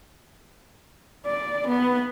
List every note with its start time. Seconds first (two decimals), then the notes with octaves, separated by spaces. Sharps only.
1.26 D5
1.68 B3